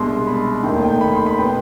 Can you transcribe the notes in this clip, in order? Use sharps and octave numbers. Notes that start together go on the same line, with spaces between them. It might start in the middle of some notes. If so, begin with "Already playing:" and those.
Already playing: C2 B2 G#3 D4 C6
B5
F1 D#2 D#3 G5
G5
B5
C6
B5
B2 B3 G5